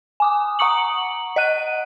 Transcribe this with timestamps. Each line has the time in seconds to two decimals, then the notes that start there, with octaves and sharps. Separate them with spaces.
0.20 G#5 D6 D#6
0.59 F#5 A#5 C#6 D#6 C#7 F#7
1.36 D#5 F#5 F#6 D#7